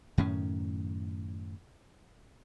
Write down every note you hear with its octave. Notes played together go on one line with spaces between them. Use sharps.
F#2 A2 D#3 C#4